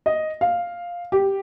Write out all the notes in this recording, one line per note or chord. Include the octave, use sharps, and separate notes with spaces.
D#5
F5
G4